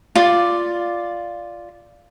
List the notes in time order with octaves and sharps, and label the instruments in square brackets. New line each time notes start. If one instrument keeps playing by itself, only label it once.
[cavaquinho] F4 D5